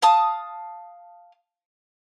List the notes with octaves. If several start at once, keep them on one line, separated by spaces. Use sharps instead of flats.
F5 A5 D#6